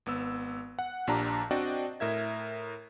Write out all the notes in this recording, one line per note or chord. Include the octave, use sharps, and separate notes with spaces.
G#1 B3 E6
F#5
A#1 A#2 D4 G4 A5 A#5
C4 D4 F#4 D5 D#5 G5
A2 A#4 E5 G#6